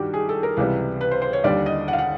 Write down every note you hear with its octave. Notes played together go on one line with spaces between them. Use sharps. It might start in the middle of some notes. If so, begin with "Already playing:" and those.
Already playing: G2 D#3 G3 F#4 G4
G#4
A4
A#4
C#2 C3 E3 G3 B4
B4
C5
C5
C#5
D#2 D3 G3 D5
D#5
F#5
F5
F#5